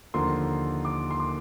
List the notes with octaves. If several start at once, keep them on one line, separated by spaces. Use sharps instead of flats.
D#2 D3 F3 A#3 C6
D6
C6
D6